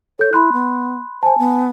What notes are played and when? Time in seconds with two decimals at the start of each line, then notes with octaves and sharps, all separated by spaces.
0.19 A4 C#5 G6
0.33 E4 B5 C6 F#6
0.53 B3
1.23 C5 G#5 A5
1.38 B3